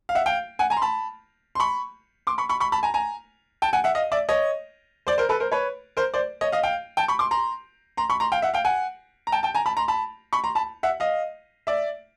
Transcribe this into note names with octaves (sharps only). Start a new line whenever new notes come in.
F5
E5 F#5
F5 G5
F#5 G#5
G#5 A#5
C6
A5 B5
C6
B5 C#6
C6 D6
B5 C#6
B5 C#6
B5 C#6
A5 B5
G#5 A#5
G#5 A#5
G5 A5
F#5 G#5
E5 F#5
D#5 F5
D5 E5
C#5 D#5
C5 D5
A#4 C5
A4 B4
A#4 C5
B4 C#5
A#4 C5
C5 D5
C#5 D#5
D#5 F5
F5 G5
G5 A5
B5 C#6
C6 D6
A#5 C6
A#5 C6
B5 C#6
A#5 C6
F5 G5
E5 F#5
F5 G5
F#5 G#5
A#5
G5 A5
G5 A5
G#5 A#5
A5 B5
A#5 C6
A5 B5
B5 C#6
A#5 C6
A5 B5
E5 F#5
D#5 F5
D5 E5